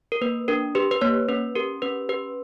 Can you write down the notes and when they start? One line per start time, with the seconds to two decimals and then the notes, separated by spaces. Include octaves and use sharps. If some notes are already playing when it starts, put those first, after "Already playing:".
0.12 A#4
0.21 A#3 B4
0.48 D4 A#4
0.75 G4 B4
0.91 B4
1.01 A#3 C#5
1.28 C#4 B4
1.56 G4 A#4
1.82 C#4 B4
2.09 G4 B4